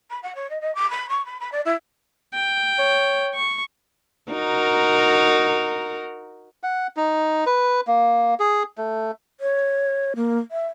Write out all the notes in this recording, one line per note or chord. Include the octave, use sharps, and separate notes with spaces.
B5
F#5
C#5
D#5
D#5
D6
B5
C#6
B5
B5
D5
E4
G5
C#5
C#6
D#4 F#4 A#4
F#5
D#4
B4
A#3
G#4
A3
C#5
A#3
E5